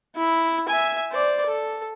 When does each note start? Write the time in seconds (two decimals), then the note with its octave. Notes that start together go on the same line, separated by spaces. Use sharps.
0.16 E4
0.68 E5 G#5
1.12 C5 D5
1.46 A4